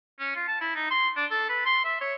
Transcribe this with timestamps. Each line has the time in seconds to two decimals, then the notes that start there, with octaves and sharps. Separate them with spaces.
0.19 C#4
0.35 F4
0.48 A5
0.61 E4
0.75 D#4
0.91 C6
1.16 D4
1.31 A4
1.49 B4
1.65 C6
1.85 E5
2.01 C#5